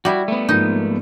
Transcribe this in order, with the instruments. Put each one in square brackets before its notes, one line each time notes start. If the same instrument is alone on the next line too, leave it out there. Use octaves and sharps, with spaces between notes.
[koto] G3 E4 [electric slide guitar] F#4
[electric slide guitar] A3 B3
[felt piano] G#2 F3 A#3 [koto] D#4